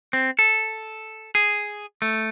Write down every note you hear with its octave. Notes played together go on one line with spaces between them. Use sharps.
C4
A4
G#4
A3